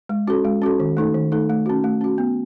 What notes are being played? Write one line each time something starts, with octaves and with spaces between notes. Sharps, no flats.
G#3
C#4 F#4 A4
G#3
C#4 F#4 A4
D#3
A3 D#4 A4
D#3
A3 D#4 A4
A3
C#4 F#4
A3
C#4 F#4
B3